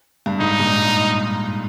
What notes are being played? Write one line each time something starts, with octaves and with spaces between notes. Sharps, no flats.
G2
G#2 D#4
G2 A#2